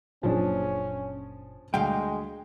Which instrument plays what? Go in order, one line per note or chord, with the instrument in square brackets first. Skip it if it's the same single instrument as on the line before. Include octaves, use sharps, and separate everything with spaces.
[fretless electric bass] F#1 A#2 F#3 [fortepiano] F3 D4 G#4 [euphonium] C#4
[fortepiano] D2 [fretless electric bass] G3 [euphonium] G#3 [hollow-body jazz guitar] F5 G5